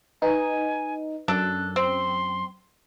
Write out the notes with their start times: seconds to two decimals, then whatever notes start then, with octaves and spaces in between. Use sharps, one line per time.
0.22 D#4 B4 G#5
1.28 F#2 D4 A4 F#6
1.76 C4 C6